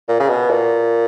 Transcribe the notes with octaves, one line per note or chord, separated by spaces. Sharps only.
A#2
C#3
B2
A#2